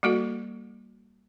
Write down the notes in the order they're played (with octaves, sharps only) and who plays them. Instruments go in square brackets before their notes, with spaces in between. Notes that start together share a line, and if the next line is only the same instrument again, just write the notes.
[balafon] G3 A#3 F#4 A4